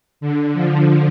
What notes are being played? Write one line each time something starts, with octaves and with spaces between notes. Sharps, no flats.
D3
F3